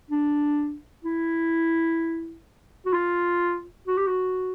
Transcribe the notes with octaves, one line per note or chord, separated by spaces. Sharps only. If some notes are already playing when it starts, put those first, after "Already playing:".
D4
E4
F#4
F4
F#4
G4
F#4